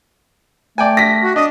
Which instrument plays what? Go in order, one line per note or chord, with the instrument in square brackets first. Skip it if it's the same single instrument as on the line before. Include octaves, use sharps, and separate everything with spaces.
[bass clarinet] A3 [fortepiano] D5 G5 G#5
[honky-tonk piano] A#6 B6
[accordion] F#4
[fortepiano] D4 [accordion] D#5